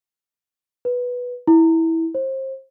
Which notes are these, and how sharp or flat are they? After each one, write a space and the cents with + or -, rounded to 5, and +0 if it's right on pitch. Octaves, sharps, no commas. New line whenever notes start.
B4 -5
E4 -15
C5 +30